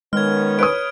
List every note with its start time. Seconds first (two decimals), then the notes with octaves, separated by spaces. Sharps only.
0.13 D#3 G#3 B3 C#4 F6 G#6
0.59 B4 C#5 D#6 D7